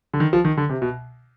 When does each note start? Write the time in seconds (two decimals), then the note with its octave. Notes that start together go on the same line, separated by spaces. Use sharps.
0.14 D3
0.20 D#3
0.33 F3
0.45 D#3
0.57 D3
0.70 C3
0.82 B2